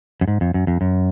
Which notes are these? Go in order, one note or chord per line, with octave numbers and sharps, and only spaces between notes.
F#2
G#2
F2
F#2
F2
F#2